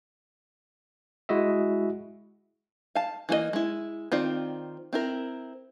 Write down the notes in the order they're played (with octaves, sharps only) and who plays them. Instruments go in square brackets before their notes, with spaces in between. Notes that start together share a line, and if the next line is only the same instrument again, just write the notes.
[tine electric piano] G#3 E4 F#4 D#5 E5
[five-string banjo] F5 A5
E3 A#3 G#4 D#5
G#3 E4
D#3 C4 F4 D5
C4 E4 A#4